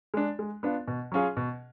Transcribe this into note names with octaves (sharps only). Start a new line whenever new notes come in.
G#3 D4
G#3
B3 D4 F4
B2
F#3 C#4 F4 G#4
B2